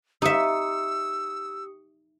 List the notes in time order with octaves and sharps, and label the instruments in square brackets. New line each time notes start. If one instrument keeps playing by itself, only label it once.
[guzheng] D#4 E5 [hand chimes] G4 D#6 C#7 [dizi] E6